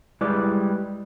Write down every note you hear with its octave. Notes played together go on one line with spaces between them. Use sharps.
G3 G#3 E4 B4 D5